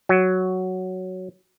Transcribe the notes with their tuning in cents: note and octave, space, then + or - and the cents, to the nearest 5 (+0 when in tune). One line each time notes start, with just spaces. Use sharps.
F#3 +5